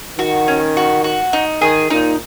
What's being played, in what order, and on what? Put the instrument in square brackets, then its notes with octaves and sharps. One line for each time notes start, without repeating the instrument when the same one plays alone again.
[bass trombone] D#3 [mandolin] F#4
[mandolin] C#4
F#4
F#4
D#4
[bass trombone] D#3 [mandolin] G#4
[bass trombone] A#2 [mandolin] D#4